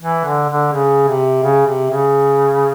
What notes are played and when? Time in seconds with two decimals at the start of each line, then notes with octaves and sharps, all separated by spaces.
0.01 E3
0.25 D3
0.49 D3
0.73 C#3
1.08 C3
1.43 C#3
1.66 C3
1.90 C#3